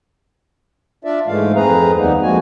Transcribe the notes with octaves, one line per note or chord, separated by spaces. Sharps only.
D4 F4 D5 E5
G#2 E3 G#3 A3 F5
F2 C4 G#4 B4 A#5
D#2 G3 A#3 B3 D#4
F2 F3 G#3 A#3 F#4 G#5